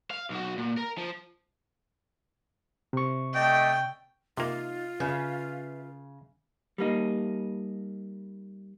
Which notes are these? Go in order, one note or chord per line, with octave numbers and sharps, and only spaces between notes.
F5
B1 F#4
A#2
A#4
F3
C3 C#6
A3 D5 D#5 G5
C3 A#3 D#4 F4
C#3 B4 E5 F5
G3 A#3 D#4